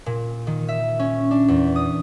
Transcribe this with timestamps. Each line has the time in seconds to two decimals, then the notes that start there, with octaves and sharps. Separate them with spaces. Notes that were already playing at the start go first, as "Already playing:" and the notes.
0.06 A#2
0.47 D#3
0.68 E5
0.99 C#4
1.31 D4
1.48 E2
1.76 D#6